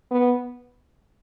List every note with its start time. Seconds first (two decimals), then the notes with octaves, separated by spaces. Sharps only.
0.11 B3